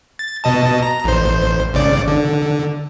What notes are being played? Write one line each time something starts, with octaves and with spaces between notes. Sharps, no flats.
A6
B2 D#5 A5
A#5
A1 C5
G#1 C#3 D5
D3